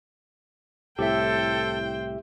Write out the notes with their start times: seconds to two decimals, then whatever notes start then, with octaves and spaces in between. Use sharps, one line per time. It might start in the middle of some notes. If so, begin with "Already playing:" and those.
0.99 C2 A2 G4 A4 C5 E5 G5